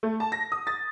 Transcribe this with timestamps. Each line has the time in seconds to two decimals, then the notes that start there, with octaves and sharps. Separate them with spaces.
0.03 A3
0.20 A5
0.32 A#6
0.52 D#6
0.67 A6